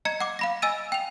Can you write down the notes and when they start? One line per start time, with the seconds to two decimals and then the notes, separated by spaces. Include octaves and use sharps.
0.05 D#5 A#5 G#6 C#7
0.20 F#5 D6
0.39 F5 B5 A#6
0.62 D#5 G#5 E6 A6 D#7
0.92 G5 F7